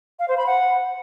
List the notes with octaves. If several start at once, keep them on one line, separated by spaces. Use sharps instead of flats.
F5
C5
B5
F#5